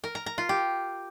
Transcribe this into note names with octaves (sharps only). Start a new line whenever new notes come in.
A#4
A#5
A#5
F4
G4